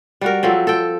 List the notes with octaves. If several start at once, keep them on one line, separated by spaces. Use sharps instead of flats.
G3 F#4 A#4
F3 F#3 C4 A4
A4 G5